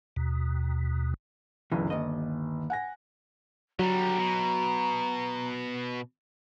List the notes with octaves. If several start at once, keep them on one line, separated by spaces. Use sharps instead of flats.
D#2 B2
G1 C#2 F#2 E3
G1 D#2 D#5
F#5 G#5 A#6
D3 F#3 G3 A#5
B2